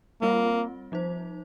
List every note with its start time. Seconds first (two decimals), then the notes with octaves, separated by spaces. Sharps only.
0.22 G3 A#3 C4 F4
0.92 F3 D#4 C5